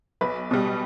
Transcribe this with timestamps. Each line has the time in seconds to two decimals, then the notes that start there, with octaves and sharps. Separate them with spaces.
0.21 B1 B4
0.51 B2 G3